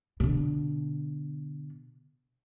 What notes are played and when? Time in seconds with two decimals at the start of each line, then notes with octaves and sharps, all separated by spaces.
0.20 B2 D3